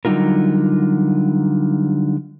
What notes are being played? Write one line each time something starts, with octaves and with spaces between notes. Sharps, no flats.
D3 F#3 G3 D#4 F4 A#4